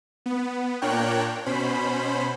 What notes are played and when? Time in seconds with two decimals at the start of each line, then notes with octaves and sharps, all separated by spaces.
0.26 B3
0.81 A#2 D4 A#4 C#5 G5 F#6
1.46 B2 C#4 C5 B5